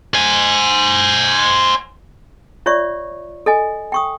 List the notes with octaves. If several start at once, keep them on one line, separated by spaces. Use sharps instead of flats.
C5 G#5
F4 C#5 D5 E5 C#6
A4 D#5 G#5
G5 C#6 D#6